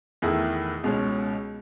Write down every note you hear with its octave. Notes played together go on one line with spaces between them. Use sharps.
E2 D#3 A3 E4 G#4
C#2 B2 G#3 C#4